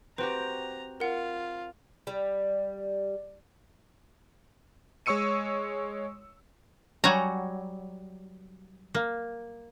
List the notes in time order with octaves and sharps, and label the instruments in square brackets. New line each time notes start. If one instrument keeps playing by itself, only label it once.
[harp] C4 F#4 G4 [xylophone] B4 C6 [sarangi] A#5
[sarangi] F4 [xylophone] A#4 F#5
[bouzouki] G3
[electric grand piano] G#3 C#5 C#6 E6 C#7 D#7
[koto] F#3 G3 C#5 G#5 A#5
A#3